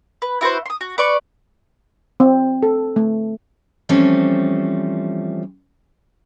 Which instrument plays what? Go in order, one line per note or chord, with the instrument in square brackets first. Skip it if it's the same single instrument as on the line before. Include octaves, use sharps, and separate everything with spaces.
[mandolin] B4
E4 F#4 B4 C5
C6 D#6
F#4
B4 D5 C#6
[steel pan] C4
A4
A3
[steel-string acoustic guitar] E3 F3 G3 A3 C4 C#4